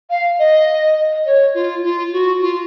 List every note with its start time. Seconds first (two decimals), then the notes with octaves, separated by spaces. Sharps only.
0.10 F5
0.39 D#5
1.26 C#5
1.54 F4
1.83 F4
2.13 F#4
2.42 F4